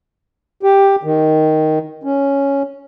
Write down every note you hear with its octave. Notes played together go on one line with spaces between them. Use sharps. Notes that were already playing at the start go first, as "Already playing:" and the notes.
G4
D#3
C#4